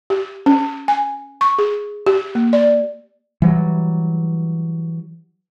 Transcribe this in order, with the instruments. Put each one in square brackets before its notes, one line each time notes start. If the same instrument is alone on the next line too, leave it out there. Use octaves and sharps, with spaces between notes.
[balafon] G4
C#4
G#5
C#6
G#4
G4
A#3
D5
[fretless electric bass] E3 F#3 G3